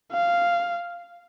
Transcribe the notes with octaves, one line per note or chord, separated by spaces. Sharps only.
F5